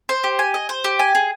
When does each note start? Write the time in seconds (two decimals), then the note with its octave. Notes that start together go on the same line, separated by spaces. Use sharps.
0.09 C5
0.24 G4
0.39 G#5
0.54 D#5
0.69 C5
0.84 G4
0.99 G#5
1.15 G#4